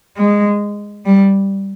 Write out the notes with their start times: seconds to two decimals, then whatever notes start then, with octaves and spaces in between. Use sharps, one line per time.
0.17 G#3
1.05 G3